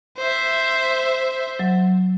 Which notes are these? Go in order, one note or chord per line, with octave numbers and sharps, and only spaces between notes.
C5 E5
F#3